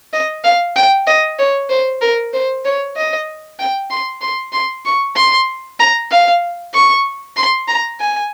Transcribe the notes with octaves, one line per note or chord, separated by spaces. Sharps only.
D#5
F5
G5
D#5
C#5
C5
A#4
C5
C#5
D#5
G5
C6
C6
C6
C#6
C6
A#5
F5
C#6
C6
A#5
G#5